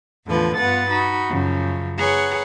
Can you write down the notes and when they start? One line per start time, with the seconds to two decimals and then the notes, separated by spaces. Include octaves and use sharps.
0.26 E2 A2 D3 F3 B4
0.57 G2 B3 F4 B4 F#5 A6
0.91 D#4 F#4 B5
1.30 F#2 C#3 F3
1.99 G#4 B4 C#5 F#5 A#5